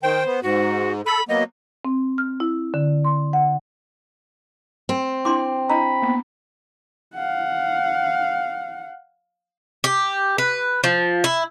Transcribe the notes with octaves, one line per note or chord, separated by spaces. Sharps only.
D#3 C5 G5
B3
G#2 F#4
A4 B5
F#3 A#3 B3 D#5
C4
F6
E4
D3
C6
F#5
C4
D4 E4 C6 D6
D4 E4 D#5 A#5 B5
A#3 B3
F5 F#5
G4
B4
F3
E4